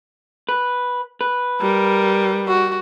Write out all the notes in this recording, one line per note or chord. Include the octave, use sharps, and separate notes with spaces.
B4
B4
G3 A#4
F#4